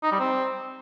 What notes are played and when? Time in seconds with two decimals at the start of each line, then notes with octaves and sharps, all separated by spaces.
0.03 D#4
0.11 G3
0.19 C4